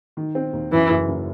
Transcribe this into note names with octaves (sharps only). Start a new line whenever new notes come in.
D#3
C4
D#2
F#2 E3
F#1
F#1